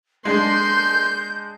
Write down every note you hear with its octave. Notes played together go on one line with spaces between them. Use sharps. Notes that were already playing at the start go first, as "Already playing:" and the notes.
G#3 D4 C6 G6